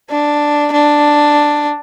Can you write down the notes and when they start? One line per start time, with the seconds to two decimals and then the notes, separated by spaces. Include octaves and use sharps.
0.10 D4
0.72 D4